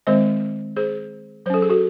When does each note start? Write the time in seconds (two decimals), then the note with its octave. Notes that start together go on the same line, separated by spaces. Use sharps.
0.07 D#3 G#3 C4 C5 D#5
0.76 G#4 C5
1.46 F#3 C5
1.50 C#4 A4
1.62 G#4
1.70 F#4 A4